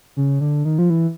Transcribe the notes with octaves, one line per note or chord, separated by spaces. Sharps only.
C#3
D3
D#3
F3
E3